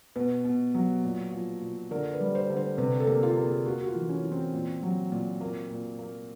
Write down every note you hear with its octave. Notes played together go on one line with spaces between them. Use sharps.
B2 B4
B2
F#3
A#2
F3
A#2
D3 A#4
B4
G3
C5
D3
C5
C3 B4
A4
A#3
F4
A#3
G#4
A#3 F#4
F#4
F4
E3
C#4
E3
C4
A#2
F#3
A#2
A#3
A#2
A#3